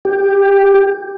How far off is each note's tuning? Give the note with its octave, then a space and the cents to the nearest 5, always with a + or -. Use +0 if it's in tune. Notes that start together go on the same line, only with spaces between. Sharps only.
G4 +15